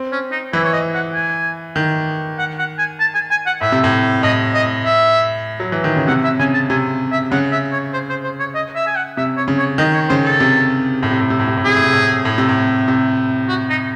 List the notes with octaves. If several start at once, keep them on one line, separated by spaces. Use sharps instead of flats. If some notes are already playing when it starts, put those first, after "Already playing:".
Already playing: C4
C#4
D#4
E3 E4
C#5
D#5
F#5
G#5
D#3
F#5
F#5
G#5
A5
G#5
G#5
F#5
A2 E5
C3
A2
A2 D#5
D#5
E5
F#3
E3
D#3
C#3
C3 F#5
E5
C#3 G#5
A5
C3 G#5
E5
C#3 F#5
E5
C#5
C5
C5
C5
C#5
D#5
E5
G#5
F#5
C3 E5
C#5
C#3
C#5
D#3 D#5
C#5
C#3 C5
A4
C3
A2
C3
A2
C3
A2
C3
A2
C3 G#4
A2
C3
A2
A2
C3
A2
C3
F#4
D#4